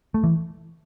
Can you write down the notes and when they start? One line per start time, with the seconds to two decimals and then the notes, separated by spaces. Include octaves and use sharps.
0.14 A3
0.24 E3